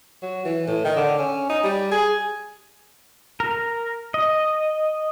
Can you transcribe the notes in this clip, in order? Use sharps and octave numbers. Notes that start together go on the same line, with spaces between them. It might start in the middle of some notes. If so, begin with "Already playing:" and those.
F#3
E3
A2
D#3
D3
C#4
D#4
G3
G#4
A#4
D#5